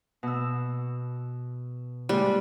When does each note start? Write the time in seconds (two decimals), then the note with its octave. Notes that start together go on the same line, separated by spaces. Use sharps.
0.23 B2 E6
2.09 A#2 G3 G#3